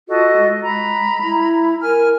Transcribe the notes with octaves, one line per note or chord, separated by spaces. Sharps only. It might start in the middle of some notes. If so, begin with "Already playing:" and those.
F4 F#4 A4 D#5
G#3
A#5 B5
E4
A#4 G#5 F6